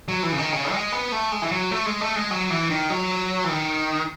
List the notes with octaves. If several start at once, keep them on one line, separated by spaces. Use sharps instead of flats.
F#3
E3
C#3
D#3
C#3
G#3
B3
A3
G#3
E3
F#3
A3
G#3
A3
G#3
F#3
E3
D#3
F#3
E3
D#3